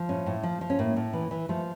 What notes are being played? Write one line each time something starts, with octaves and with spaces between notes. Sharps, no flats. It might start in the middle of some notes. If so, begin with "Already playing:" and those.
Already playing: F3
A2 C#4
A2
F3
F3
C#4
A2 A#3
A2
E3
E3
F3 A3